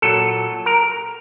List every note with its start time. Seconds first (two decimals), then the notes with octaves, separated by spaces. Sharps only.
0.02 A#2 F#3 A4
0.66 A#4